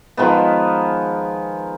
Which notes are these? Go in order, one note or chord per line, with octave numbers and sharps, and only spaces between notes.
D#3 F3 G#3 B3